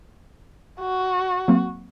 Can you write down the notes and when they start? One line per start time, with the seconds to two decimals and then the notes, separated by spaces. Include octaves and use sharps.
0.80 F#4
1.48 F#3 A#3 C4